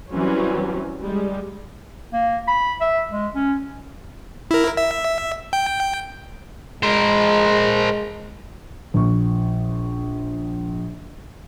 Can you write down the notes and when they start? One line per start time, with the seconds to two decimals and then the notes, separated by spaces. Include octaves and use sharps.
0.12 E3 F#3 G3 C4 C#4
1.01 G3 G#3
2.13 A#3
2.48 B5
2.81 E5
3.11 G#3
3.35 C#4
4.51 E4 A#4
4.77 E5
5.53 G5
6.83 G#3 A#4 C5
8.94 A#1 C#6